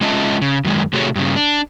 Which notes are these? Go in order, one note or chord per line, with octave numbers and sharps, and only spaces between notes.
G#3 C#4 F4 D#5 E5 A5
C#3
F#2 D#3 G#3
A2 C3 A3 F#4 G#4 C#5
G2 C#3
D4